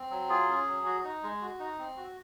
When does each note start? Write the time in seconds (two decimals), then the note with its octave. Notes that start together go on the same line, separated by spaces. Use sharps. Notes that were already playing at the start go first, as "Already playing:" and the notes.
Already playing: C4
0.10 F#3
0.29 F4 G#4
0.48 C#4
0.67 F#3
0.86 F#4
1.04 D#4
1.23 G#3
1.42 F#4
1.60 D#4
1.79 C4
1.97 F#4